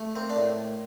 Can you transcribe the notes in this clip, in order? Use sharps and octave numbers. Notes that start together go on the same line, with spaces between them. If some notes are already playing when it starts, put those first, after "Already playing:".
Already playing: A3
A#3 C4
D4
A2